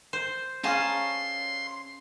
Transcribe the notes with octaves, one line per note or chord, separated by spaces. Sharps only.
C5
C#4 G#4 F5 A5 A#5 C6